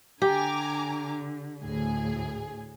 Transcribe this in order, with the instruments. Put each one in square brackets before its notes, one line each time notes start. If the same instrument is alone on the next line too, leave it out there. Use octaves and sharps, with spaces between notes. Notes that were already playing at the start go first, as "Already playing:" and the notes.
[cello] D3 [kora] G4 [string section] G#5 A#5 D6
[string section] D2 A2 G#4